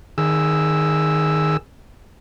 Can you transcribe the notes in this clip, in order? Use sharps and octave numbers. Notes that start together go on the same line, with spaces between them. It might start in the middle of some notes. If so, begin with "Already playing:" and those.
D#3 G#4 E6